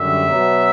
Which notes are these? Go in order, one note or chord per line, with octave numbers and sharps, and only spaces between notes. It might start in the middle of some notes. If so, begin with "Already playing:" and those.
Already playing: F#2 D3 G3 E5
B2 F#3 B3